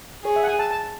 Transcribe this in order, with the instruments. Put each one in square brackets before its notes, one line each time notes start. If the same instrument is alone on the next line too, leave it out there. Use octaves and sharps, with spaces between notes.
[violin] G#4 [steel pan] C#5
[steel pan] E5
F#5
G#5
A5
A5